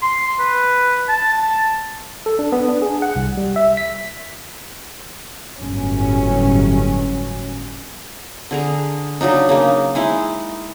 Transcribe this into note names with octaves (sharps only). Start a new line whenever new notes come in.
C6
B4
A5
A4
D4
B3
D4
G#4
F#5
C2
G3
E5
B6
G1 A2 F#3 C#4
D3 G#4 A#5
C#3 F#3 D4 D#4
C#3 A#3 D#4
G#3 D#4 E4